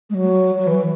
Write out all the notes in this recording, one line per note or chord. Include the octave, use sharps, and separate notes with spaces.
G#3
F#3
F#3
E3